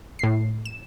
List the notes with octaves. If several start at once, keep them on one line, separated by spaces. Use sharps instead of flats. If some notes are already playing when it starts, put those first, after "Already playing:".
A2 C7
E7